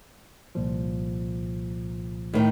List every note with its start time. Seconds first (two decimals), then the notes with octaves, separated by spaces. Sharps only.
0.55 C2 A#2 F3
2.34 A2 D#3